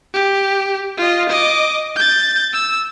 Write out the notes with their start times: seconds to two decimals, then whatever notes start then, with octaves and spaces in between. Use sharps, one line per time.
0.14 G4
0.98 F4 D#5
1.29 D#5 D6
1.96 G6 A6
2.53 E6